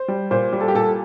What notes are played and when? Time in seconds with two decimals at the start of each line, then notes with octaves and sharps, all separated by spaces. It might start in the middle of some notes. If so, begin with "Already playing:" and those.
Already playing: C5
0.08 G3
0.31 A#2 C5
0.52 G3
0.60 A4
0.68 G4
0.75 A#2 A4